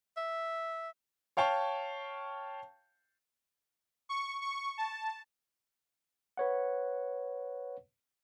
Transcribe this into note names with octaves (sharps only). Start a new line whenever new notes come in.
E5
C#5 F5 G5 A5 C#6
C#6
C#6
A5
B4 C#5 F#5